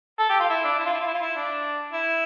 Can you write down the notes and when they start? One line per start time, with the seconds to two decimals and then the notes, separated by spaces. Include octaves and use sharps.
0.19 A4
0.29 G4
0.39 F4
0.50 E4
0.64 D4
0.79 E4
0.85 F4
0.93 E4
1.00 F4
1.07 E4
1.14 F4
1.21 E4
1.36 D4
1.93 E4